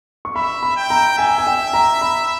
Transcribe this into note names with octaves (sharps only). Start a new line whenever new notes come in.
C#6
E5 B5
B5
G5
A#5
E5 G#5
G#5
G5
A#5
B5